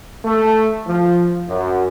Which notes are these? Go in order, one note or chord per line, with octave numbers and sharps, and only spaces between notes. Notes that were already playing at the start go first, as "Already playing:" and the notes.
A3
F3
F#2